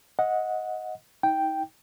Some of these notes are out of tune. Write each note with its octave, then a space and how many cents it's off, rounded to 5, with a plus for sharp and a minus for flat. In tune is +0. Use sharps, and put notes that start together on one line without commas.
D#5 +15 F#5 -15
D#4 +30 G5 +0